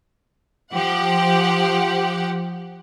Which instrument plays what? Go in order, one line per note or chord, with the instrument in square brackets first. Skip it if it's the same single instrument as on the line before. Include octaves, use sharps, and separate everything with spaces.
[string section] F3 G4 F#5